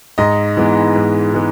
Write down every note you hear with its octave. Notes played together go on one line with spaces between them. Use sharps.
G#2 D#5
E3 G#3 B3
G#2
E3 G#3 B3